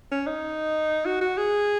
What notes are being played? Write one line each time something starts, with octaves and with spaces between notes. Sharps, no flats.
C#4
D#4
F#4
F#4
G#4